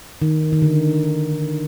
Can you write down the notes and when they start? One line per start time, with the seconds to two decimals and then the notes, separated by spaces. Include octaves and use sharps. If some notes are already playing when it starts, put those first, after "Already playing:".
0.22 D#3
0.53 D#3
0.62 D3